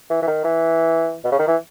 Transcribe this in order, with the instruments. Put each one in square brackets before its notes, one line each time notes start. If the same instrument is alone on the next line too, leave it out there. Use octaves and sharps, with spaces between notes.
[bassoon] E3
E3
D#3
E3
B2
C#3
D#3
E3